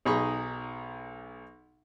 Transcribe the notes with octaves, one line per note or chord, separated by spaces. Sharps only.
B1 D#4 G#4 B5 C#6